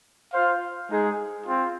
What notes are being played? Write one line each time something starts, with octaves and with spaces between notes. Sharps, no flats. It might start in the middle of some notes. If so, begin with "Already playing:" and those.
F4 C5 F5
G#3 D#4 G#4
C4 F4